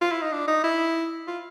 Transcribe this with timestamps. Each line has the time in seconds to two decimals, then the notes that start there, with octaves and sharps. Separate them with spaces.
0.01 F4
0.11 E4
0.22 D#4
0.33 D4
0.48 D#4
0.64 E4
1.27 F4